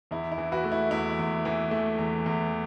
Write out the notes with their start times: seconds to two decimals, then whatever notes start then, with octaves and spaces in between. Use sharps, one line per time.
0.11 E2 E4
0.32 E4
0.38 E3
0.52 F#4 B4
0.64 A3
0.72 E4
0.91 E2 E4
1.19 E2
1.45 E3
1.71 A3
1.98 E2
2.26 E2